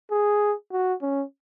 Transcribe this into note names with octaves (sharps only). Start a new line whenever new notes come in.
G#4
F#4
C#4